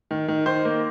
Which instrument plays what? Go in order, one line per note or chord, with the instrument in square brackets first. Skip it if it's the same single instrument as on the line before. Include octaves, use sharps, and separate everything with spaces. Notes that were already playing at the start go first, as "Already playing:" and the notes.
[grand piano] D#3
D#3
D#3 C5
A#3